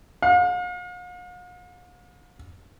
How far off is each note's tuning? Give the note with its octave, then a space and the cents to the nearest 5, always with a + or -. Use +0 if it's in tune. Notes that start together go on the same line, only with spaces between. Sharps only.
F5 +45